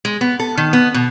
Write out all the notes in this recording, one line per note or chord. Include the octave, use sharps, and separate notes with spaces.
G#3
B3
A4
D#3
B3
B2